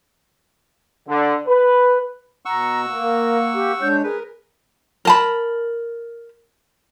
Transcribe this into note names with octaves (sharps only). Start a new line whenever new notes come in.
D3
B4
B2 F#5 A#5 C#6 E6
A#3
A#4
G4
G#3 D4 C#5 G6
G#4 A#4 B4
A#4 A5 B5